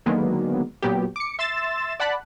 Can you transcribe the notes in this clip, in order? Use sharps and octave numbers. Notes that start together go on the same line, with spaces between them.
D3 D#3 F#3 G#3 A#3 B3
A#2 F#3 B3 G4
D6 C#7
E5 C6 E6 A6 E7
D5 F#5 A5 B5 F#6